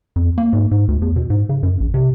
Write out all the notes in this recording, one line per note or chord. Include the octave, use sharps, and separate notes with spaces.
F2
A#3
G#2
G#2
D2
E2
B2
G#2
C#3
F#2
A#1
C3